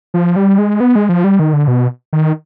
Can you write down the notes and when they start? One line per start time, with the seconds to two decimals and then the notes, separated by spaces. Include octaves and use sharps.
0.14 F3
0.36 G3
0.58 G#3
0.80 B3
0.96 G#3
1.09 F3
1.24 G3
1.39 D#3
1.53 D3
1.68 B2
2.13 D#3